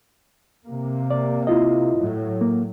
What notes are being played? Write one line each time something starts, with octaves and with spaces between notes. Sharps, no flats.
C3 A#3
D5
E4 F4 D#5
A2 F#3
A#3